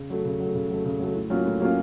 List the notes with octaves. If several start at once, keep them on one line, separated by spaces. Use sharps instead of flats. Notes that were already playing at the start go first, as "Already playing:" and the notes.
Already playing: C#3
F#3 A3
C#3
F#3 A3
C#3
F#3 A3
C#3
F#3 A3
A2
F#3 A#3 C#4 F4
A2
F#3 A#3 C#4 F4